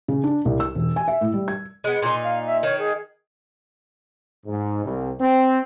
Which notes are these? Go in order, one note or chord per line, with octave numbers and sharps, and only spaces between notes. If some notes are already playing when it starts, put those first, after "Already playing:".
C#3
D4
C2
E6
E1
G#5
E5
A2
G3
G#6
G#3 B3
A#2 D#4 C6
F5
E5
D#3 C#5
G#4
G#2
C2
C4